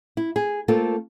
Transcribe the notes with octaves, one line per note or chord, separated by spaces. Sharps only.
E4
G#4
A3 A#3 C4 F4 A4